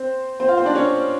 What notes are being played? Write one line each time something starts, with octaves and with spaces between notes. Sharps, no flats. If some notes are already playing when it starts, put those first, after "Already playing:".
Already playing: C4 C5
C4 C5
F4 F5
C4 C5
D4 D5
C#4 C#5